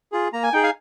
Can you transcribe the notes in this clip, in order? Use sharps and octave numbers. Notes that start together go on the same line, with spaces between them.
F4 G#4
A#3 A#5
G#5
D#4 G#4 G5
F5 G#5